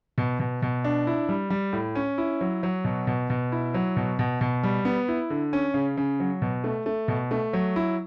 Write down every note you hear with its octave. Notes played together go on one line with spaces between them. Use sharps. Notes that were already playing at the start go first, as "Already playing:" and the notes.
B2
B2
B2
D4
E4
G3
G3
A2
C#4
E4
F#3
F#3
B2
B2
B2
E4
F#3
B2
B2
B2
G3
B3
E4
D3
C#4
C#3
C#3
F#3
B2
A3
A3
B2
A3
F#3
E4